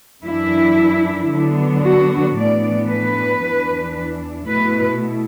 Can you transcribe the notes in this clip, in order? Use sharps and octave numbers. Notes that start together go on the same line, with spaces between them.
F#2 E3 D4 E4
D3 F#3 B3 D4
F#4
A2 E3 B3 D4 D5
B4
E2 E3 D4
B2 A3 E4 B4